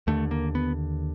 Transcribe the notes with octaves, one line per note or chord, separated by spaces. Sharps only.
D#2 D3 A3
A#3
B3